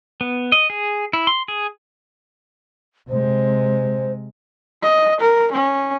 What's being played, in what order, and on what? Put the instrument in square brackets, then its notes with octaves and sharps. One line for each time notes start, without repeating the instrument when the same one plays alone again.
[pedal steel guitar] B3
D#5
G#4
E4
C6
G#4
[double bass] C3 G#3 [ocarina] C5
[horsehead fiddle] D#5
A#4
C#4